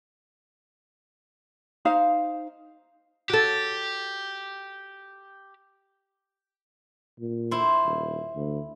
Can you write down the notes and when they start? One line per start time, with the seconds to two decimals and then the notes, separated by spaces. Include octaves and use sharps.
1.85 D#4 C5 F5
3.30 F#4 G4 A4
7.20 A#2
7.51 E4 C5
7.85 D#1
8.36 D2